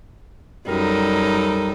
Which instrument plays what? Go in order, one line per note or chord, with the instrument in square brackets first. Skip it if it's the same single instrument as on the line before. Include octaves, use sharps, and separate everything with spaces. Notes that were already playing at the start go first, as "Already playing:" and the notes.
[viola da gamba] F#2 D#4 A4 [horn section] G3 A#4